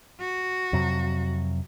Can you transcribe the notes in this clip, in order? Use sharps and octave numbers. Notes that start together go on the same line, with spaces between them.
F#4
F2 C3 F#3